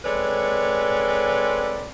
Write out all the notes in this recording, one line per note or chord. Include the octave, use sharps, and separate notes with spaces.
G#3 C4 A4 B4 C#5 D5